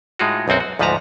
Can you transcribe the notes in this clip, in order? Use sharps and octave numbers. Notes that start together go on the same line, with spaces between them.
A2 G#3 D#4 F4 F#4
B1 F#2 C4 F#4
F#4
D2 G#2 F3 B4 A5 A#5